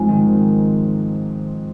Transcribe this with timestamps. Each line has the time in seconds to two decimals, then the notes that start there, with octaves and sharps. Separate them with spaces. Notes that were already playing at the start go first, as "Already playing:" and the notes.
Already playing: G#2 F3 G#3 C4
0.09 D#3